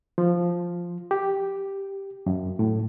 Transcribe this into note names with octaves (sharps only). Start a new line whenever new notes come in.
F3
G4
F#2
A2